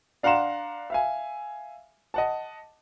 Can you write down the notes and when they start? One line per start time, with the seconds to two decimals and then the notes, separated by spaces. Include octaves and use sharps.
0.23 D4 F5 F#5 A#5 C6 E7
0.90 E5 F5 G#5
2.14 D#5 F#5 A5